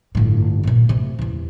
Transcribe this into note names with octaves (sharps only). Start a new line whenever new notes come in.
G1 A2
A#2 A3
C3
E2 C3